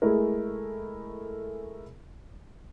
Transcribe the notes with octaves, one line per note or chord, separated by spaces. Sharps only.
G#3 A3 E4 G#4 A#4